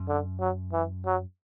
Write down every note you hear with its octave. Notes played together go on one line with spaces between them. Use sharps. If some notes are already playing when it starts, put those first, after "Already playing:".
Already playing: F#2
D3
F#3
E3
F#3